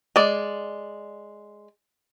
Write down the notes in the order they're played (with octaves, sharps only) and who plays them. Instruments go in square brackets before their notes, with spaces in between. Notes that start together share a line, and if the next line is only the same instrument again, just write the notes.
[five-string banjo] G#3 D5